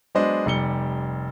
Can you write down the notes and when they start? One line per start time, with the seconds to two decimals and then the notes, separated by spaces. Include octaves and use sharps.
0.15 F#3 G#3 B3 D4 C5 D#5
0.46 F1 G3 C#7 G7